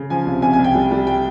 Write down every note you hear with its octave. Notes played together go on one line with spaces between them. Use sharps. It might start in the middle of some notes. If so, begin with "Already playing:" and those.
Already playing: C#3
F3 G#5
C2
C2 G#5
G#5
C2
G5
G3
G3
G5